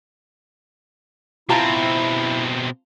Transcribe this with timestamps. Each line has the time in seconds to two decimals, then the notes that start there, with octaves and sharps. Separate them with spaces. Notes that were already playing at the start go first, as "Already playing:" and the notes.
1.49 B2 C4 E4 F4 A5 A#5